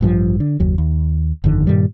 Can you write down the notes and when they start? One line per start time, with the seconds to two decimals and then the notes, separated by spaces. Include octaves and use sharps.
0.01 A1 G2 C#3 F3
0.40 D3
0.60 F#1 D#2 F#3
0.78 D#2
1.44 G1 F2 D3 D#3
1.67 G2 A#2 D#3 G3